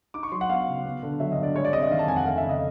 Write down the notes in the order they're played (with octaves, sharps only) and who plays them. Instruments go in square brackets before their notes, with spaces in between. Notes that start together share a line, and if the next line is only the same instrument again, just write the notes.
[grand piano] D#4 D6
C#6
F#3 C6
F#5
B3 F5
C#3
B3
D3
F#3 E5
D#5
G2
D5
G#3 C#5
D5
C3 D#5
E5
D#3 F5
A5
F2 G#5
F#5
A3 F5
E5
C#3
D#5